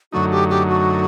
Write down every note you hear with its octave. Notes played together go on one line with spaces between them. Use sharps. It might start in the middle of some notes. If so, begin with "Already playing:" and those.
F#2 D3 F#3 A3 D#4 F#4
G4
G4
F#4